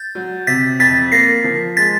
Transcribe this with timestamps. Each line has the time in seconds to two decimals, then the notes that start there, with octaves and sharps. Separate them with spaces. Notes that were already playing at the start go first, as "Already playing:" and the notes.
Already playing: G6 A6
0.15 F#3
0.47 C3 A6 B6
0.79 F2 A6 B6
1.12 A#3 A#6 C7
1.44 F3
1.77 G#3 A6 B6